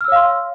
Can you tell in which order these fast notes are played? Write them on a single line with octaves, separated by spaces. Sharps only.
F6 E6 C#5 F5 C6